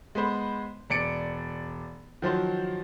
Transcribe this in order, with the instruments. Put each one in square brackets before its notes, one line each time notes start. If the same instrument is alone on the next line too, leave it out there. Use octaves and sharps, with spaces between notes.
[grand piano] G#3 B3 B4 C5
E1 D5 C#7 D7
D#3 F3 F#3 C5